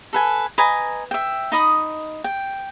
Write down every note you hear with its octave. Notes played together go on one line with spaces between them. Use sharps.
A4 B4 G#5
B4 D#5 G#5 A#5
E5 G5
D#4 D#5 B5 D#6
G5